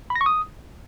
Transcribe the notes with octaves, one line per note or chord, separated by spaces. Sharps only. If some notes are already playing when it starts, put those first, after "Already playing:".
B5
A#6
C#6
D#6